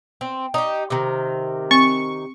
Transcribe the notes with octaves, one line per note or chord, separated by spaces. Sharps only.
C4
D#4 G4
C3 D#3
C4 C#6